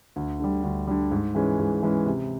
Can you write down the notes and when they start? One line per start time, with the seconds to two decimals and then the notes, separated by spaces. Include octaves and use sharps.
0.16 D2
0.40 D3 G3
0.64 D2
0.87 D3 G3
1.12 G#2
1.35 E3 G#3 C#4
1.59 G#2
1.83 E3 G#3 C#4
2.06 C3